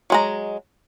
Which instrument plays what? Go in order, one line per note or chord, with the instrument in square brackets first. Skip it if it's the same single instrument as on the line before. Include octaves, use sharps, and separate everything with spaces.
[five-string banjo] F#3 G#3 A#5